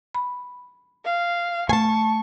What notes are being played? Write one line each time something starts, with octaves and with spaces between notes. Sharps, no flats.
B5
F5
A3 G#5 A5 C#6